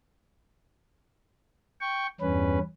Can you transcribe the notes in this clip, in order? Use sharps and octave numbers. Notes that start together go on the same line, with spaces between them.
G5 C#6
E2 G2 C#4 B4